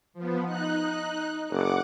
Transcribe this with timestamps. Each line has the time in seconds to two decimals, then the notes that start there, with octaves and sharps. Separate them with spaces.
0.13 F3 B3
0.45 D#4 F#6
1.50 F#1 F#5 D6